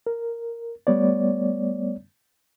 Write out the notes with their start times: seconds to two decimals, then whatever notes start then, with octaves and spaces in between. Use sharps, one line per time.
0.07 A#4
0.87 G3 A3 B3 C#5 D5